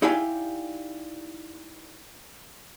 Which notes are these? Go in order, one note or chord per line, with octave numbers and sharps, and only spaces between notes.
D#4 E4 G4 D5 F5 G#5